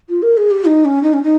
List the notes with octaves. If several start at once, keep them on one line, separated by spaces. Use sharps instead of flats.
F4
A#4
G#4
G4
D#4
C#4
D#4
C#4
D#4